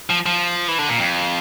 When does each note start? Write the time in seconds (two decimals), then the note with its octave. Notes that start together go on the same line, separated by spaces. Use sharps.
0.10 F3
0.26 F3
0.68 E3
0.79 D3
0.89 A#2
0.98 F2